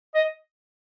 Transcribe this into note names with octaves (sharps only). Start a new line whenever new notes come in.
D#5